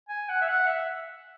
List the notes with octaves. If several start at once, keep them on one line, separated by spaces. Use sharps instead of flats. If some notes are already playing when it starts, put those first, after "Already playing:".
G#5
F#5
E5
F#5
E5